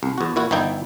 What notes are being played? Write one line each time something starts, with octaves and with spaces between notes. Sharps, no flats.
C2
E2 F#4
A#2 E4 F#4
G1 E3 D#4 E4 G5